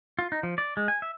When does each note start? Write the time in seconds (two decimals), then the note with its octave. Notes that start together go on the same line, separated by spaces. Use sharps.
0.19 F4
0.32 D#4
0.43 F3
0.58 D5
0.77 G#3
0.88 G#5
1.02 E5